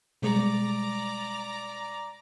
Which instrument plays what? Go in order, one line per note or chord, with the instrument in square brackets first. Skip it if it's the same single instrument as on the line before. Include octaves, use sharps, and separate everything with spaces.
[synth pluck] B2 G3 G#3 [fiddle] D5 A#5